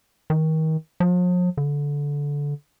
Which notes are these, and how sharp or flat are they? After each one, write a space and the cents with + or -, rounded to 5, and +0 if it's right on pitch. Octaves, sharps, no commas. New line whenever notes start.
D#3 +30
F3 +45
D3 -20